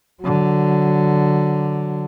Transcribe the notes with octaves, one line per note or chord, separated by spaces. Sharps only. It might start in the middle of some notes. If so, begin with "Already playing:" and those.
D3 F#3